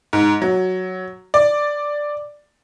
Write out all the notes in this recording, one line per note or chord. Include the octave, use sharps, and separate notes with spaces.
G#2
F#3
D5